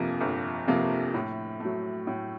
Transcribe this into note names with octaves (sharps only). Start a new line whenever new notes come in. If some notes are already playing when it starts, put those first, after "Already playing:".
Already playing: G1 F2 C3 F3 A#3
G1
F2 C3 F3 A#3
A2
F#3 A3
A2